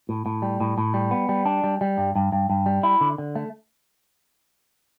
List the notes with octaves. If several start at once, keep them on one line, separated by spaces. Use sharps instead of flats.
A2
A2
G3
A2
A2
G3
B3
G3
D4
G3
G3
G2
G2
G2
G2
G3
E4
D3
D3
A3